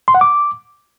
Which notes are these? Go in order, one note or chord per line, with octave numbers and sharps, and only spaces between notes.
C6
F#5
D6